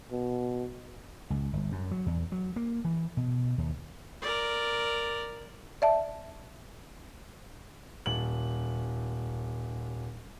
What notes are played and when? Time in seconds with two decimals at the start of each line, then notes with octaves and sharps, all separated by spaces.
0.12 B2
1.30 C#2
1.53 G1
1.72 F#2
1.91 F#3
2.06 E2
2.32 F#3
2.56 A#3
2.85 E3
3.17 B2
3.58 D#2
4.22 A#4 D5
5.82 D5 E5 A5
8.06 D#1 F#7